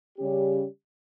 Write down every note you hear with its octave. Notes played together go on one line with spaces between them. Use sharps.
C#3 G3 C#4 G4